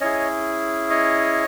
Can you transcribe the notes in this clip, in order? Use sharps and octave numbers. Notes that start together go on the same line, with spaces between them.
C#4 E4 G#4 C#5 D#5
C#5 D#5